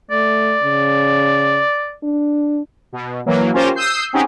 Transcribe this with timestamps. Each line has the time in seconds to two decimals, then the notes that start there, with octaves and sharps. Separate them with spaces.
0.11 A3 D5
0.63 C#3
2.03 D4
2.92 B2
3.26 E3 F#3 A#3
3.53 C#4 F4 G4 A#4 C5
3.75 D#6 E6 G6 C7
4.13 C4 C#4 D#4 G4 G#4 F#5